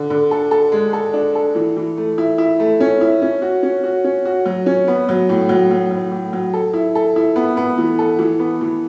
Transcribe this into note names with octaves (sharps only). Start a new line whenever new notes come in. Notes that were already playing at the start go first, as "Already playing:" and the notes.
Already playing: D3
D3
A4
A4
G#3
A4
D4
A4
E3
E3
A3
E4
E4
A3
C#4
E4
C#4
F#4
C#4
F#4
C#4
F#4
F#3
C#4
B3
F#3
A2
F#3
F#3
F#3
A2
F#3
A4
E4
A4
E4
B3
B3
E3
A4
E3
B3
E3